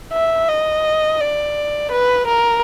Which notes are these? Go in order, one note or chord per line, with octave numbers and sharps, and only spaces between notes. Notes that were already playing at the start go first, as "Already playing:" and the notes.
E5
D#5
D5
B4
A#4